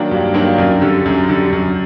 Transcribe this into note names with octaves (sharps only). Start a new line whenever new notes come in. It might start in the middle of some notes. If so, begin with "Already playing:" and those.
Already playing: D#3 F#3 A#3 D4
G2
D#3 F#3 A#3 D4
F#2
D3 G3
F#2
D3 G3
F#2